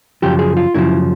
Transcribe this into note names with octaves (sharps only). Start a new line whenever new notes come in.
F#2 C#3 F3 G4
G#4
F4
F#2 C#3 F3 E4